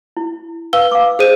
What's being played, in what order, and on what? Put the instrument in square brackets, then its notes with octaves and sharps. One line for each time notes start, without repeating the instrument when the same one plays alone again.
[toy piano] E4
[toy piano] B4 F5 [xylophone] E6 G7
[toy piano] F5 D6
[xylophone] G#4 C5 D#7